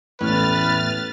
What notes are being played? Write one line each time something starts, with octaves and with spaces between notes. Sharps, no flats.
A1 E2 A2 B4 F6 A6